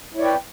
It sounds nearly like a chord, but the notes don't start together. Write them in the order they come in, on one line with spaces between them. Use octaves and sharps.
E4 C#5 D5 B4 G5